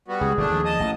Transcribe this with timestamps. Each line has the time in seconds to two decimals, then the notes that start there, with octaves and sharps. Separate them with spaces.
0.08 G3 B3 F#4
0.21 C#2 G#4
0.37 G1 B2 D#3 A3 D4
0.50 D#2 F3
0.65 D#5 A5 D#6
0.80 A1